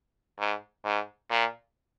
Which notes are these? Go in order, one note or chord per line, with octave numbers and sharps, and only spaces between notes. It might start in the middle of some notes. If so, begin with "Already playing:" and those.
G#2
G#2
A#2